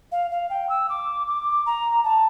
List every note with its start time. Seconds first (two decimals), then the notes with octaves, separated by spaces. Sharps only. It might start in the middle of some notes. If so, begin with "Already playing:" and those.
0.12 F5
0.31 F5
0.50 G5
0.69 E6
0.89 D6
1.27 D6
1.66 A#5
2.04 A5